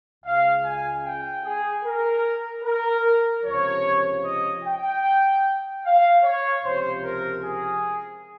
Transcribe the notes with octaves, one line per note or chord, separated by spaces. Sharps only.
C#2 C#3 G#3 F5
G#5
G5
G#4
A#4
A#4
C#2 C3 F3 C#5
D#5
G5
F5
C#5
C#2 C3 F3 C5
A#4
G#4